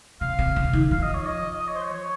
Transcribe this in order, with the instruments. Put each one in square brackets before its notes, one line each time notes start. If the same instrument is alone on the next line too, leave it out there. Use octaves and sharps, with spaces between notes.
[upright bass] C3 [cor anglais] F5
[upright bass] C3
C#3
D#3
[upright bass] F3 [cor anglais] F5
[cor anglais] D#5
C#5
D#5
D#5
C#5
C5
C#5
C#5